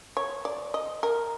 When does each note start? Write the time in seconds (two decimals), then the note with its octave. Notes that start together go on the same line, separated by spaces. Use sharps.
0.17 C#5
0.45 D5
0.74 D#5
1.03 A#4